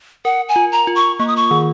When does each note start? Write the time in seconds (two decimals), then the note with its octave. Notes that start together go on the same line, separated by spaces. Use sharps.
0.25 A#4 F#5
0.49 G#5
0.56 F4
0.72 A#5
0.87 F4
0.95 C#6
1.19 A#3 C#6
1.28 D#6
1.36 C#6
1.51 D#3